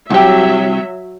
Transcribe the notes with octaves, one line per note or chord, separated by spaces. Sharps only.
C2 F#3 G4 E5